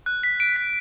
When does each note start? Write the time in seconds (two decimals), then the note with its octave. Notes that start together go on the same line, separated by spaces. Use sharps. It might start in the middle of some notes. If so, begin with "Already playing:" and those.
0.06 F#6
0.23 B6
0.40 D7
0.56 B6